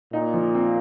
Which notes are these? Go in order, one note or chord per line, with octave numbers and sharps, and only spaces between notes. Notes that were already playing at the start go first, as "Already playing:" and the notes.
A#2 A#3 D#4
F3
C4